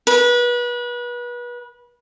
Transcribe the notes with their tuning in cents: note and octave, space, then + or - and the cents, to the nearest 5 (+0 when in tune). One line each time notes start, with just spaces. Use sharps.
B4 -30